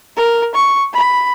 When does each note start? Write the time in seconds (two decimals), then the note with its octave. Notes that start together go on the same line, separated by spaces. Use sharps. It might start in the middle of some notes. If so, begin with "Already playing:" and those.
0.17 A#4
0.55 C#6
0.94 B5